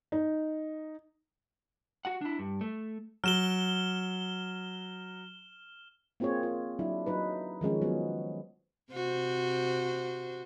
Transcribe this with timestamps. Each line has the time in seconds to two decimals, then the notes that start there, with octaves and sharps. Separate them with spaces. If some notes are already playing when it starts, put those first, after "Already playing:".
0.12 D#4
2.05 F#4 F#5
2.21 D4 E4
2.39 G2
2.61 A3
3.24 F#3 F6 E7 G7
6.20 A#3 C4 F4 G#4 C#5
6.43 F4
6.79 F#3 D4 E4
7.06 F#3 D#4 B4
7.61 D#3 F3 G#3 C#4
7.82 F#3 B3
8.93 C3 F#4 C5